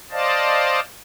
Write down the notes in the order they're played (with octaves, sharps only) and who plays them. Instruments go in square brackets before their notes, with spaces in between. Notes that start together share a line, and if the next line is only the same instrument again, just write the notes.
[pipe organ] C5 D5 D#5 F5 A5